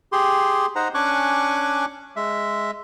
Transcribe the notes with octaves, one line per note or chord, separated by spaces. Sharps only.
G4 G#4 C6
D#4 C5 F#5 A#5
C#4 D4 G#5 C#6 D6 F#6
G#3 E5